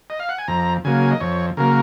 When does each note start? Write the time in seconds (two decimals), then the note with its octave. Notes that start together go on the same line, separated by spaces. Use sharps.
0.10 D#5
0.20 F5
0.29 F#5
0.38 G#5
0.48 F2 A#5
0.84 C#3 F#3 A#3 G#5
1.11 D#5
1.20 F2 C#5
1.57 C#3 F#3 A#3 A#4